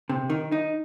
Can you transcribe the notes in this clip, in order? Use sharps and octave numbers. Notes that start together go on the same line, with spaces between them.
C3
D#3
D#4